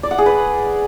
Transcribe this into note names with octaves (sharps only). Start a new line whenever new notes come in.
D5
F#5
G#4
B4